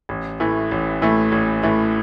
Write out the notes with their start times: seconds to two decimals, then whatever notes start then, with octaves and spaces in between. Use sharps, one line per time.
0.09 A1
0.40 A2 E3 A3
0.71 A1
1.02 A2 E3 A3
1.32 A1
1.63 A2 E3 A3